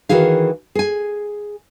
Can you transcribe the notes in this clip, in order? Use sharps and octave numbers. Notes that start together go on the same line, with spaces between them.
D#3 E3 F#4 G#4 F5
G#4 G#5